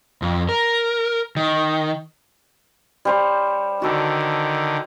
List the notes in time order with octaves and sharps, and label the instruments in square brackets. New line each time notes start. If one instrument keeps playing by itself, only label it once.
[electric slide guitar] F2
A#4
D#3
[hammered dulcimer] G3 C5 C#5
[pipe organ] D3 D#3 [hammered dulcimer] F#4 A4